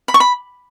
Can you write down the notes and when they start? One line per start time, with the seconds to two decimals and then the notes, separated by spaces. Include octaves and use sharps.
0.08 B5
0.14 C#6
0.20 B5